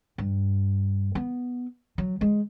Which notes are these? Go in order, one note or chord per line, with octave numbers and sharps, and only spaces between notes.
G2
B3
F#3
G#3